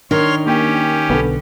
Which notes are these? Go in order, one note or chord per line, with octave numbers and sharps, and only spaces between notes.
D#3 D4 C#5 C6 F6
A#3 C#4 G4 G5
B1 D3 B3 A4